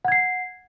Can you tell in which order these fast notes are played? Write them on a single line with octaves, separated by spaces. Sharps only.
F#5 G#6 C7